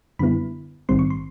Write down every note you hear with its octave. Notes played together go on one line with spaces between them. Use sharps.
F#2 D3 G3 B3 E4 B5
A#1 G#2 D#3 G3 C4 C6
C#6
C6